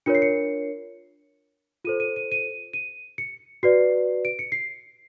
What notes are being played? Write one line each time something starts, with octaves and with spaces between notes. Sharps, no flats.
D4 F4 A#4 C#5 C#7
C7
C#7
F4 A4 C5 D#7
D#7
D#7
D#7
D#7
C#7
F#4 B4 D5 C7
D7
C#7
C7